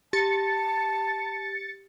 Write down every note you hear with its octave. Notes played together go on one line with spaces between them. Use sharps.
G4 A5 A6 C#7